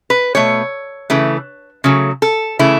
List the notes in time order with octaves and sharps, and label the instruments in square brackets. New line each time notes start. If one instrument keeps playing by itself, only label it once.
[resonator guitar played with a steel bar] B4
B2 A3 C#5
C#3 E3 A3
C#3 F#3 A3
A4
C#3 E3 A3 E4